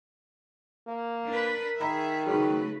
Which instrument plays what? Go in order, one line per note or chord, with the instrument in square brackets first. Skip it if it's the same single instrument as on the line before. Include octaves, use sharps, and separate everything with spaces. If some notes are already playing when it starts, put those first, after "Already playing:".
[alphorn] A#3
[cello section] D4 B4 [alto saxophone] A#4
[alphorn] D#3 [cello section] G#4 E5 [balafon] D#5 A#5 B5
[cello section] C#3 A3 B4 [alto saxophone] F#3 [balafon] D#4 F#4 G#4